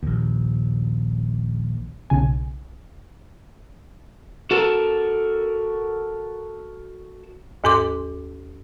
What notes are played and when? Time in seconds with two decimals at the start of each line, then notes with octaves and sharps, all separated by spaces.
0.03 A#1 D#2
2.10 B1 C#3 G#5
4.51 F#4 A4 A#4
7.64 D#2 G#2 A4 C6 D6